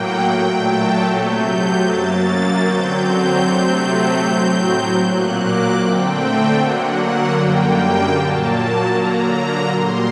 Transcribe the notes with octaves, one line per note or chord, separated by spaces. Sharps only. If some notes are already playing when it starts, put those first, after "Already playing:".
Already playing: A2 F#3 A#3 F#5 G5
A#2 F#3 A3 G5
A5
C3 F#3 A3 G6
F#2 F#3 A#3 A6
D3 F#3 C4 G6
C3 F#3 A3 C4
A2 F#3 C4
A#2 F#3 A#3 F#6
D6
D3 A3 C4 G5
D3 F#3 A#3 F#5
F#5
F#2 D3 G3 A#3 G5
A#2 F#3 A#3 A5
D3 F#3 A#3 A#5
A#2 G3 A#3 C6